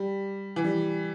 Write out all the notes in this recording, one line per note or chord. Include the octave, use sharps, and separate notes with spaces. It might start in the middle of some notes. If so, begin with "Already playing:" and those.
Already playing: G3
E3
G3